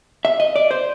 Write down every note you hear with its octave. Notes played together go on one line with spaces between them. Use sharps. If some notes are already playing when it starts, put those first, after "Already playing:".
E5
D#5
D5
C5